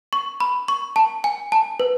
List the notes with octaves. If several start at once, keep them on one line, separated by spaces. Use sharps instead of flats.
C#6
B5
C#6
A5
G#5
A5
B4